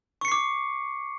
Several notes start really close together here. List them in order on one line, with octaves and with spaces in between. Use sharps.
C#6 C#7 C7 D6